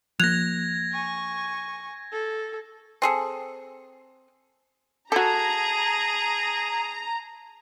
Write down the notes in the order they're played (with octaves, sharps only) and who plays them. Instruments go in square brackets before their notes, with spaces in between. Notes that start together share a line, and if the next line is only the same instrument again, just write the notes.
[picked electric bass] F3 A#3 [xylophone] F#6 F7 [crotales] G#6 A#6
[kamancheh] G#5 C#6
A4
[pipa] C4 G#4 A4
[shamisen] F#4 A4 [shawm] G#4 [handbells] A5 G#6 [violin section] A#5